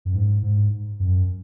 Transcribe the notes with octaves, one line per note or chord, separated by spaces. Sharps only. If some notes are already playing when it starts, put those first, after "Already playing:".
F#2
G#2
G#2
F#2